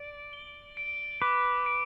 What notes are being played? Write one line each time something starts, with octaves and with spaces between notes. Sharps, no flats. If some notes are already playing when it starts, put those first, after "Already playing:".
Already playing: D5 D7
G7
D7
B4 D6
D7